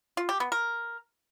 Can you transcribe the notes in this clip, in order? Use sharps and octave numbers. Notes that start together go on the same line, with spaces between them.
F4
G4
B3
A#4